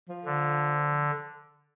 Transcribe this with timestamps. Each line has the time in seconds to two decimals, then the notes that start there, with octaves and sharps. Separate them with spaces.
0.09 F3
0.25 D3